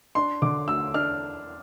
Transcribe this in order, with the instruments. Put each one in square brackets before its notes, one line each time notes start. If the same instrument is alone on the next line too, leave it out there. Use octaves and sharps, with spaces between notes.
[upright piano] D4 [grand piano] C6
[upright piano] D3 [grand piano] D6
[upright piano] D2 [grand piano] E6
[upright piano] D4 [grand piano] F6